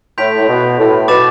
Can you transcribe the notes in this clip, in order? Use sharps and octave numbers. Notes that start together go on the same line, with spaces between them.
A2 C6 G6 B6 D7 F7
A2
B2
A2
B2 B5 D6 A6 E7